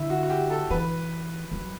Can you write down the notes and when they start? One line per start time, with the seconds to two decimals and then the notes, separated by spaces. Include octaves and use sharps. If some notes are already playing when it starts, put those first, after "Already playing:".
Already playing: D3 E4
0.10 F#4
0.23 F#4
0.30 G4
0.50 A4
0.70 E3 B4
1.52 F#3